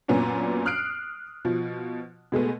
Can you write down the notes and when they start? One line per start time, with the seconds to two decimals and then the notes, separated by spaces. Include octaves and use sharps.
0.08 F#2 A#2 B3 C#4 D4 F#4
0.65 D#6 F6 F#6 C7 D7
1.45 B2 F3
2.32 B2 G#3 A3 B3